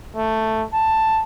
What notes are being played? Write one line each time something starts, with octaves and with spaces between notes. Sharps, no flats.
A3
A5